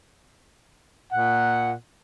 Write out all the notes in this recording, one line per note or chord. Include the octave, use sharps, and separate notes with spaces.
A#2 F#5